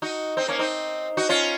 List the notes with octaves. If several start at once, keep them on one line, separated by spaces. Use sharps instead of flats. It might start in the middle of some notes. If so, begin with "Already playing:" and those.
D#4 F#4
C4 D#4
A#3 C#4
C4 D#4
D#4 F#4
C#4 F4